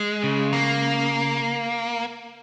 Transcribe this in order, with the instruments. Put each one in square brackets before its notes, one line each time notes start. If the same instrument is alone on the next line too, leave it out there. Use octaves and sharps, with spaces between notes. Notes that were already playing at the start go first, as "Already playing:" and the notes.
Already playing: [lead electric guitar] G#3
[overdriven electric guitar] C#3
[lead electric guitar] A#3